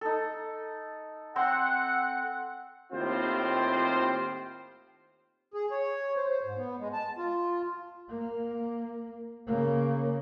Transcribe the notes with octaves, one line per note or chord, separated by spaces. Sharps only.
D#4 A4
C4 F#5 C6 E6
D#2 A2 C4 F4 G4 C5
G#4
C#5
C5
C5
G#2
B3
G#3
A5
F4
A#3
C#3 A#3